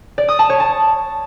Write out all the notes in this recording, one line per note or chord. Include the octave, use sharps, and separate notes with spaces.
D5
D#6
A5
C#5
A5